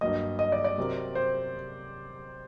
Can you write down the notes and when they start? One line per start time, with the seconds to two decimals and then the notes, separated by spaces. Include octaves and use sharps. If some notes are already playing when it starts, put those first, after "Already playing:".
0.01 G2 F#3 A#3 D#5
0.39 D#5
0.52 D5
0.64 D5
0.78 C3 F#3 C4 G4 A#4
1.15 C5